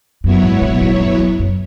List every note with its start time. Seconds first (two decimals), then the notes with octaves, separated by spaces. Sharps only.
0.24 F#2 F#3 B3 E4 C#5
0.43 G#2
0.62 B2
0.81 G#2
1.00 F#2
1.19 E2
1.39 F#2